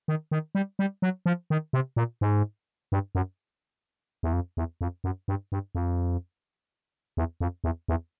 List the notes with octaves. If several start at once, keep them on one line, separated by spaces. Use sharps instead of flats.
D#3
D#3
G3
G3
F#3
F3
D#3
C3
A#2
G#2
G2
F#2
E2
F2
E2
F2
F#2
G2
G2
F2
E2
F2
E2
E2